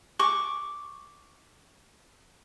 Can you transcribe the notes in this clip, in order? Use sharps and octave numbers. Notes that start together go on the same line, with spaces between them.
C#6 D6